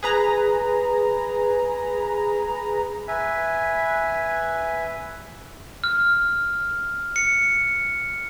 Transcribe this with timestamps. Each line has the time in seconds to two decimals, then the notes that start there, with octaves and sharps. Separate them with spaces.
0.03 G#4 B4 A#5
3.08 B4 E5 G#5
5.84 F6
7.16 C#7